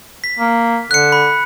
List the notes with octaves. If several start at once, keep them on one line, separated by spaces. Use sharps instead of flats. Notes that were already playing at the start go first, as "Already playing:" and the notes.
B6
A#3
D3 F#6 C#7
B5